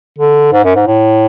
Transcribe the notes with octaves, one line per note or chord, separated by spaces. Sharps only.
D3
G#2
F#2
G#2
A2